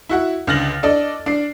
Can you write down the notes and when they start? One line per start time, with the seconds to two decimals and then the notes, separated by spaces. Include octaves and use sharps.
0.09 E4 F#4 F#5
0.47 C#2 D3 F6 A6 A#6 F#7
0.83 D4 A4 D5 D#5
1.26 D4 C7